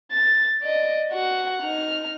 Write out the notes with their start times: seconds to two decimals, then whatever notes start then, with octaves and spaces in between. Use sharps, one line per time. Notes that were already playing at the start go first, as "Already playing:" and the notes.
0.11 A6
0.63 D5 D#5
1.12 F#4 F#5
1.63 D#4 F6